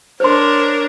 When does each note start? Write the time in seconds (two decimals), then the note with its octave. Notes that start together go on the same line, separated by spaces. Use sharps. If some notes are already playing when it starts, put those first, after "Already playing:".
0.20 D4 A#4 C5 C#5 C6